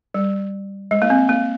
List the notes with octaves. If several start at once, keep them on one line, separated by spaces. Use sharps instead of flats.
G3
G#3
A#3
C4
A#3